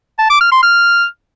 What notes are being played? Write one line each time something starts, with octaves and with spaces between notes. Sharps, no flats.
A5
D6
F6
C6
F6